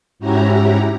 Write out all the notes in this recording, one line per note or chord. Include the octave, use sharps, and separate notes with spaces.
G#2 C#4 E4 F#4 G4 A#5